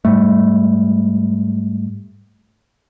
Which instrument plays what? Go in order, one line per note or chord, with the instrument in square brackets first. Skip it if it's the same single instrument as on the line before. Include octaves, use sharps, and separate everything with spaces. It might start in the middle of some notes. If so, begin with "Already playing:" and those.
[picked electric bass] G#2 G3 A3